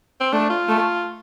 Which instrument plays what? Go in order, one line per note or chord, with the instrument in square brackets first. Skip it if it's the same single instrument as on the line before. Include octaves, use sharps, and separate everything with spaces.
[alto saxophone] C4
[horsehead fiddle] A3 [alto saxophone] D4
[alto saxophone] F4
[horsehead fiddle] A3